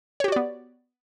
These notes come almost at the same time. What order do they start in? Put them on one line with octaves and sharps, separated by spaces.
C#5 G4 F#4 D5 B3